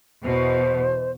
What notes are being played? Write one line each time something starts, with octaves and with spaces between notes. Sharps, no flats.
E2 B2 C5